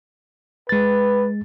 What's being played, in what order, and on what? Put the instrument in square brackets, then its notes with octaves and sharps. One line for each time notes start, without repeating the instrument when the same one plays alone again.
[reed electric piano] G#3 A6 [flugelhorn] B4